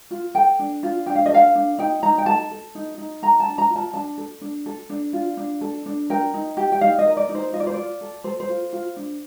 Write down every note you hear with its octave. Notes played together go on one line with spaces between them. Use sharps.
F4
A4 G5
D4
F4
D4 G5
F5
D#5
A4 F5
D4
D#4 G5
D#4 A#5
G5
A4 A5
A4
D#4
D#4
A4 A#5
A5
D4
A#5
F4
A5
D4 A5
A4
D4
A4
D4
F4
D4
A4
D4
A#4 G5
D#4
G4
G5
D#4 F5
D#5
A#4
D5
D#4
C5
F4 D#5
D5
C5
F4 D5
A4
A4 C5
C5
F4
F4
D4